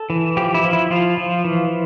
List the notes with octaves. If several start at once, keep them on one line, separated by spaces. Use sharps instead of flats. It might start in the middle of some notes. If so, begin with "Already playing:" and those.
Already playing: A4
E3
F3 G4
E4
F3
E4
F3 F4
F3
E3